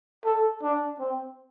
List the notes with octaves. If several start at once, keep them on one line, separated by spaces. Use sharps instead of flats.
A4
D4
C4